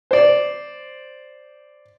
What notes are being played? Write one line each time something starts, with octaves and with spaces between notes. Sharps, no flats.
C5 D5